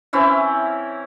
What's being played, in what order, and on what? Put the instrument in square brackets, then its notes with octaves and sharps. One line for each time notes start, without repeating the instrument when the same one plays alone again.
[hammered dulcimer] E3 C4 C#4 E4